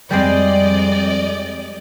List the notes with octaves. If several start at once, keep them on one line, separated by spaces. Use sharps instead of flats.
F2 G3 G#3 C4 D5 D#5